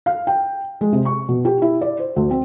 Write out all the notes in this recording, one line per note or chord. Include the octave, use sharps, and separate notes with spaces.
F5
G5
G#3
C3
C#6
B2
G4
E4
D5
C5
D2
C4